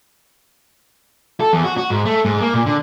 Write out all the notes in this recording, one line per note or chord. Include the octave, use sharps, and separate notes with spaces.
A4
E2
F#4
F#4
G#2
A3
G#2
A#3
A#2
D3